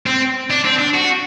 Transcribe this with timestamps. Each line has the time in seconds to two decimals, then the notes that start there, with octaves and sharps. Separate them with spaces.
0.06 C4
0.50 D4
0.64 C4
0.78 D4
0.94 F#4